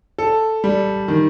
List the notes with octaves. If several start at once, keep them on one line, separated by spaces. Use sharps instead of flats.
A4
G3
D#3